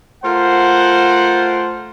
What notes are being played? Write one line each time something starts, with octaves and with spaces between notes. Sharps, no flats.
A3 F4 A#4 C5 F#5